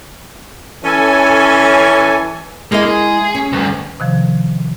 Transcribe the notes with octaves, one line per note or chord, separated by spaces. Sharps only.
E3 C#4 A4 G#5
G#3 A#3 E4 D#5
G#4
C#4
D2 G2
C3 D#3 F3